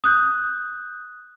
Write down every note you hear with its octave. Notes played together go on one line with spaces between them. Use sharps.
D#6 F#6 G6